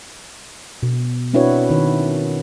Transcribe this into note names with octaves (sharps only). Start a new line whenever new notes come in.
B2
C4 D4 E4 F#4 B4 C#5
D#3 C#5